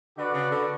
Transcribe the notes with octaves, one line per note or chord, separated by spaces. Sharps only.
D3 F#4 B4 D5
C#3
D3